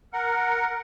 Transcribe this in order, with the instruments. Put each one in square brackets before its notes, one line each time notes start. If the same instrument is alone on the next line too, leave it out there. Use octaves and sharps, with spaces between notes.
[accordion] A#4 F#5